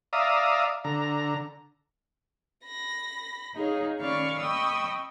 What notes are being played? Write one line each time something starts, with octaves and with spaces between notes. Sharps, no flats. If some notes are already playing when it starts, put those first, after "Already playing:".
D5 E5 F5 A#5 D#6
D3 A#5
B5 A#6
D#4 G#4 C#5 F5
D#3 C#4 D5 F5 B5 C#6
D#5 G5 B5 C#6 D#6 E6